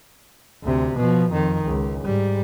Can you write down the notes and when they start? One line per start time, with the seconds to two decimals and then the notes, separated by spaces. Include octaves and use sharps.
0.63 D2 C3
0.96 B2 F3
1.32 F2 D#3
1.67 C#2
2.04 G#2 G3